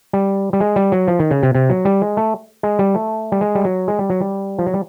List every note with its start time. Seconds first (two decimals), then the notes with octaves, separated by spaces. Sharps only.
0.13 G3
0.53 G3
0.60 G#3
0.76 G3
0.92 F#3
1.08 F3
1.19 D#3
1.31 C#3
1.43 C3
1.55 C3
1.70 F#3
1.85 G3
2.02 G#3
2.17 A3
2.63 G#3
2.79 G3
2.94 A3
3.32 G3
3.41 G#3
3.55 G3
3.65 F#3
3.88 G#3
3.99 G3
4.10 F#3
4.21 G3
4.59 F3
4.67 F#3
4.74 G3